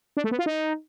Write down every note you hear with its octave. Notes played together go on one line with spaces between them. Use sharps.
D4
A3
B3
F4
D#4